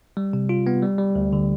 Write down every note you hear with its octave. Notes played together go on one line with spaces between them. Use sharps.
G3
C3
F4
B3
G3
G3
D2
D3